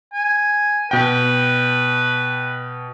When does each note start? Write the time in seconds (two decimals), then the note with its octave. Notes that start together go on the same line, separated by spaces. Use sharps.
0.13 G#5
0.91 B2 B4 G5